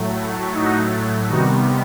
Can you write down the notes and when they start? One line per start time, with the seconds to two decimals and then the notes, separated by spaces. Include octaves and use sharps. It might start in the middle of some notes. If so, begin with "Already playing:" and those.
Already playing: A2 F#3 A3
0.54 D#4 F#4
1.28 C3 D#3 G3 B3 D#4 F#4